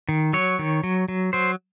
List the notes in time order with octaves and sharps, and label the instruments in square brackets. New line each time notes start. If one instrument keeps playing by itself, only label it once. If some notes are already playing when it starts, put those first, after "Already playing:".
[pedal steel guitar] D#3
F#3 C#5
D#3
F#3
F#3
F#3 C5